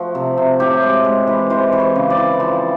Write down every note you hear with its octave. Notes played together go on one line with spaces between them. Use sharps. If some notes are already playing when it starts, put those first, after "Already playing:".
Already playing: F3 A3 F#4
C3
C3
A2 G4
G#3
G#3
E3
E3 C5
E3
C#5
C#3
D5
E3
F3